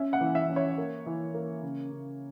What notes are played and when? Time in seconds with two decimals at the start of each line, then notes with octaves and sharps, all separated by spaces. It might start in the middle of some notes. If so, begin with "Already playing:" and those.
Already playing: C#4 E5
0.13 F#5
0.21 E3
0.35 E5
0.50 C#4
0.56 C#5
0.78 A#3
1.06 E3
1.34 A#3
1.63 C#3
1.91 C#3